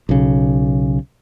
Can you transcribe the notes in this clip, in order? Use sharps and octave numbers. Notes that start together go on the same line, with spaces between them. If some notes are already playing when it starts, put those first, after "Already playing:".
B1 C#3